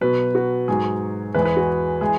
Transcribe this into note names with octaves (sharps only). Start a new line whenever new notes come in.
B2 F#3 B4
F#4
G#2 F#3 G#4
E2 E3 G#3 B4
G#4
B4
F#4
E3 G#3 G#4